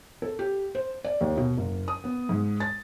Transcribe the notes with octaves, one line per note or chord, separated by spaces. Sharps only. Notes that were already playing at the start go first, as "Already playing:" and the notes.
A4
G4
C5
D5
D#2
B2
F#1
D#6
B3
G#2
A6